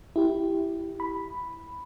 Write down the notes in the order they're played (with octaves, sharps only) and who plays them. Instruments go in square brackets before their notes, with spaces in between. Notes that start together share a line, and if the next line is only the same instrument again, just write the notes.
[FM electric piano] E4 G4
B5